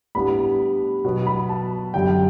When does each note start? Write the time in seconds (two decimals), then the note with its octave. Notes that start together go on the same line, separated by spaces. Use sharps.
0.15 A2 G3 B3 D4 B5
1.05 B2 F#3 B3
1.27 B5
1.49 A5
1.94 F#2 D3 G3 G5